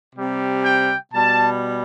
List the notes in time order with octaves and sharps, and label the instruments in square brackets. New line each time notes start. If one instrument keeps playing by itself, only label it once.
[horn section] C3 G3
G5
B2 G3 A5